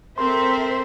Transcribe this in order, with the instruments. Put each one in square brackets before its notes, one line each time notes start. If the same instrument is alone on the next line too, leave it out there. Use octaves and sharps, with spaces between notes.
[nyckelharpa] C4 A#4 [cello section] A4 C5 E5 [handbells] C6